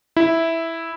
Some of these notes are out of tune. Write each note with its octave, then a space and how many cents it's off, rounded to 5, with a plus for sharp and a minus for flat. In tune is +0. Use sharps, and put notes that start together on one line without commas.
E4 -5